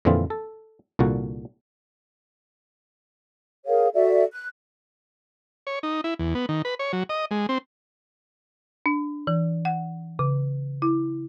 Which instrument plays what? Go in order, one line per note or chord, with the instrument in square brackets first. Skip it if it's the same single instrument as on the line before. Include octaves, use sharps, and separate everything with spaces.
[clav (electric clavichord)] F2 A#2 D3 E3 C4 F4
A4
C2 A#2 D3 F#4
[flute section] G#4 A#4 C#5 F5
F#4 A4 D5 E5
F#6
[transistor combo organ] C#5
D#4
E4
E2
B3
D#3
B4
C#5
F#3
D#5
G#3
C4
[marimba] D4
E3
F#5
C#3
E4